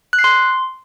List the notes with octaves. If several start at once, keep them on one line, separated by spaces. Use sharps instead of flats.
F#6
C7
C6